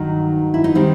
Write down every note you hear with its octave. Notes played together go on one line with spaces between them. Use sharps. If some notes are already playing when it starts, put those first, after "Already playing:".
Already playing: G2 D#3 F#3 D#4
E4
D#4
D#3 G3 C4